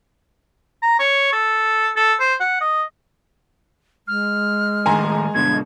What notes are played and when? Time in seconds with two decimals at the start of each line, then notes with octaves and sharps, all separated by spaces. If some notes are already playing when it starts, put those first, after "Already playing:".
0.82 A#5
0.99 C#5
1.33 A4
1.96 A4
2.19 C5
2.40 F#5
2.61 D#5
4.08 G#3 F6
4.86 A2 D#3 A#4 G#5 A#5 C6
5.35 G2 B2 D3 G#6